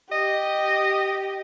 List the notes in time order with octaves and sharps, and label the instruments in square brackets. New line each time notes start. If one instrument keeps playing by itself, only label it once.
[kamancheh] G4 [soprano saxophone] D#5